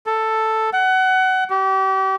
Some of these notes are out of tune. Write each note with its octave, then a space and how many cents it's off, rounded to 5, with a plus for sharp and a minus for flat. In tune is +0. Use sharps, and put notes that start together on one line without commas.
A4 +5
F#5 +25
G4 -35